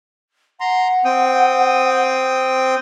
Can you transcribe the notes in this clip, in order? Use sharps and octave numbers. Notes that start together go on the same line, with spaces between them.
F#5 A#5 C6
C4 G5 D#6